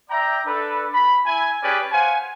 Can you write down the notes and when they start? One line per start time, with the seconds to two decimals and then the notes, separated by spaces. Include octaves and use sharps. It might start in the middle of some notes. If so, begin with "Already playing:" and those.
0.10 D5 E5 G5 A#5
0.46 D4 A4 B4
0.93 B5
1.26 E4 G#5
1.63 C#4 G4 G#4 B4 D5 G5
1.92 C5 F5 F#5 G#5